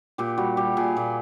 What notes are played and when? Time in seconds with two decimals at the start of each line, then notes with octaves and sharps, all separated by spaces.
0.18 A#2 G4
0.38 G3 F#4
0.57 G3 G4
0.77 A#2 G#4
0.97 A#2